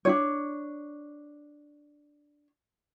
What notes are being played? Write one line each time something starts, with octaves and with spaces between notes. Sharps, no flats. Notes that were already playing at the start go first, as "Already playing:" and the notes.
D4 D#4 C#5